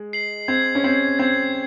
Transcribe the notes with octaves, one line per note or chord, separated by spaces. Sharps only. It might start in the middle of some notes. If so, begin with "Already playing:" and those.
Already playing: G#3
C7 F#7
C4 G#6
C#4
C4 C7 F#7
C4 G#6